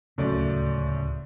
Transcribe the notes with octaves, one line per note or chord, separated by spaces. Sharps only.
D1 C#2 F#2 C#3 A3 D5